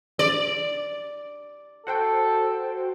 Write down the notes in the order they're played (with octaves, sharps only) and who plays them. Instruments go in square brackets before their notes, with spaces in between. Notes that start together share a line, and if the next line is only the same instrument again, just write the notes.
[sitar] D5
[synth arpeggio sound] F#4 C5 G5 [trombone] A4